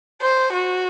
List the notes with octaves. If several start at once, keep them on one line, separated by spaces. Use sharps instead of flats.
C5
F#4